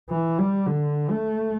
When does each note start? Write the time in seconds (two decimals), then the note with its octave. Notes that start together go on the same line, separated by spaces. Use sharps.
0.10 E3
0.39 G3
0.67 D3
1.10 A3